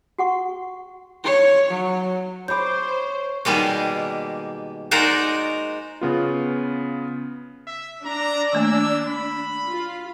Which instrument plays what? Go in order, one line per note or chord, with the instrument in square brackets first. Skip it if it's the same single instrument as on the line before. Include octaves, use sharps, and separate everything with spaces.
[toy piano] F#4 F#5 C#6
[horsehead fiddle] C#5
F#3
[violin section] C5 [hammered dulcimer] C#5 D6 [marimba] B5 G6
[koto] B2 D#3 G3 G#3 A#3
G#3 D#4 F#4 A#4 C5 D5
[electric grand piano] C#3 B3 F4
[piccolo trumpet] E5
[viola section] D4 [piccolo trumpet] A#5
[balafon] D#3 A3 A#3 [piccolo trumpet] E6
[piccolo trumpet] B5
[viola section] F4